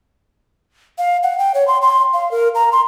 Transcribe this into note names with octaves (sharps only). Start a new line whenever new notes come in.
F5
F#5
G5
C#5
C6
C6
F5
A#4
A#5
C6